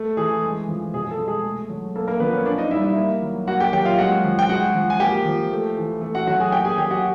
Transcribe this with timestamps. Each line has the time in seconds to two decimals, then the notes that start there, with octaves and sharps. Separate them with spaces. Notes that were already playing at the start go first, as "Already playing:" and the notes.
Already playing: A3
0.17 E3 G#4
0.42 G#3
0.68 F3
0.94 B2 G#4
1.11 A4
1.19 G#3
1.28 G#4
1.44 A3
1.69 F#3
1.96 A#3 A4
2.08 A#3 A#4
2.20 F3 B3 B4
2.33 C#4 C#5
2.46 A#3 D4 D5
2.58 D#4 D#5
2.71 G3 E4 E5
2.84 E4 E5
2.96 A#3
3.22 F#3
3.47 A#3 F#4 F#5
3.60 G4 G5
3.73 F#3 G4 G5
3.85 F4 F5
3.98 G#3 F#4 F#5
4.24 F3
4.39 G5
4.49 G#3 F#4 F#5
4.75 F3
4.90 G#5
5.00 A#3 G4 G5
5.26 F3
5.51 A3
5.77 E3
6.01 A3
6.15 F#4 F#5
6.27 F#3 F#4 F#5
6.40 G#4 G#5
6.52 A#3 G4 G5
6.65 G#4 G#5
6.78 F#3 G4 G5
6.91 F#4 F#5